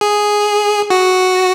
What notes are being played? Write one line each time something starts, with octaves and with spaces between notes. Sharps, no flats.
G#4
F#4